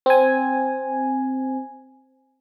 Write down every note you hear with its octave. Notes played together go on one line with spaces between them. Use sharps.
C4 G#5